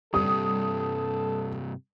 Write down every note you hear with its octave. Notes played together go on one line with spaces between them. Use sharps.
G2 C3 G3 A4 D#6